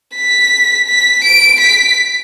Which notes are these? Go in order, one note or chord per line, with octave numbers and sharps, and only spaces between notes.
B6
B6
D7
B6